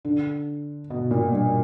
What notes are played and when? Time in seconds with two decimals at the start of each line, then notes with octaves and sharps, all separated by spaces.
0.05 D3
0.90 B2
1.11 A#2
1.32 G2